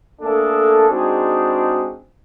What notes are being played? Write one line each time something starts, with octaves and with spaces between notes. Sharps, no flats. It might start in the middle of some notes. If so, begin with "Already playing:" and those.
A3 A#3 D4 G#4 A4
G#3 C4 D4 D#4 F#4 G#4